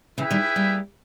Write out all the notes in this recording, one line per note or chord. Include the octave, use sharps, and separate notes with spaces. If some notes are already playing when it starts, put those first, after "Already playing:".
C#3 E3 E4 G#4 B4 E5 G5
D#3 G3
G3 A#3